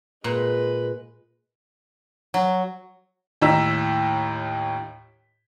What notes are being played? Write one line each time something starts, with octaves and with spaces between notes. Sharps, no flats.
A#2 G#3 B4
F#3
D#2 A2 D#5 A#5 E6 B6